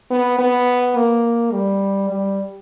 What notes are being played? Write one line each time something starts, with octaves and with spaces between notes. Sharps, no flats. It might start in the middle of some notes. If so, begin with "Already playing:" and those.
B3
B3
A#3
G3
G3